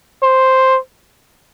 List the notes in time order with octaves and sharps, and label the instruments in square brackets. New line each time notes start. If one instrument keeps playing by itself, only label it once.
[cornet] C5